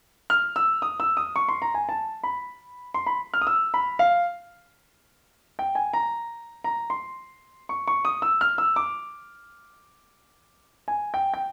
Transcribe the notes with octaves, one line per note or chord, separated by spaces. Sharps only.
F6
E6
D#6
E6
D#6
C#6
C6
A#5
G#5
A5
B5
C6
B5
F6
D#6
E6
B5
F5
G5
G#5
A#5
A#5
C6
C#6
C#6
D#6
E6
F6
E6
D6
G#5
G5
G5